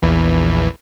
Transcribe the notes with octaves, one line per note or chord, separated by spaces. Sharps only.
A#1 E2 E3